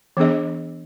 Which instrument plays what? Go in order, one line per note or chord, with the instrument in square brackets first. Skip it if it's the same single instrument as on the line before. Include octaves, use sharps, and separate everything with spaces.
[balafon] E3 B3 D4 G#4 D#5